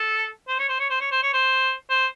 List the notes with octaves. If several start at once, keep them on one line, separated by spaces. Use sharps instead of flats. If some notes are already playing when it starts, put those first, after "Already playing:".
Already playing: A4
C5
C#5
C5
C#5
C5
C#5
C5
C#5
C5
C5